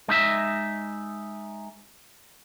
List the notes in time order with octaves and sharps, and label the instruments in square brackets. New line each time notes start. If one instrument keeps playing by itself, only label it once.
[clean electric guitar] G#3 D#4 E5